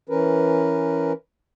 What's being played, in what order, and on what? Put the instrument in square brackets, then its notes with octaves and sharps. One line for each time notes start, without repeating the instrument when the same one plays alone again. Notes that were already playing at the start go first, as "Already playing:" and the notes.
[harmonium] E3 C#4 A#4 B4